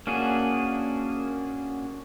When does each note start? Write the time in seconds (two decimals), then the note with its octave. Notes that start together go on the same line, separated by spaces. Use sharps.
0.07 A#3 C#4 D4 F#4 G#4